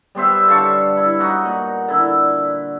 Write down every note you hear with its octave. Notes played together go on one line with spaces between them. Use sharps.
G3 B3 C5 E5
D3 F5 A5 C#6
E4
D#4 F#4 F#5
A#2
D3 E4